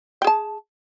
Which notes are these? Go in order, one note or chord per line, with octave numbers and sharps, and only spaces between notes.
G#4 G5 A5